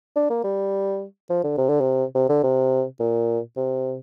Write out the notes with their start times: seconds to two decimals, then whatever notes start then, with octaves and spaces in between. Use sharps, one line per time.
0.16 D4
0.30 A#3
0.44 G3
1.30 F3
1.44 D3
1.58 C3
1.69 D3
1.81 C3
2.15 C3
2.29 D3
2.44 C3
3.00 A#2
3.57 C3